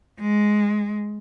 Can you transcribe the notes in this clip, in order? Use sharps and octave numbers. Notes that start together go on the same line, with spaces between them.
G#3